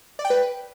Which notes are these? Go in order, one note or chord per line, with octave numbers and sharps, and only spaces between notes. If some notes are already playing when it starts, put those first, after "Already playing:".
D5
G5
B4